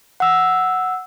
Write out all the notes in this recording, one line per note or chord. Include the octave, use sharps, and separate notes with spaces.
F#5 E6